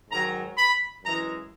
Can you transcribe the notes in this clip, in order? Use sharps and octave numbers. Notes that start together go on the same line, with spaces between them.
G#2 D#3 F#3 A#5
B5
F#2 E3 G#3 A#5